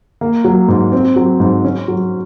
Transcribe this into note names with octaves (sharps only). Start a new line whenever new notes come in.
A#3
F#3
G#2
C4
F#3
G#2
C#4
F#3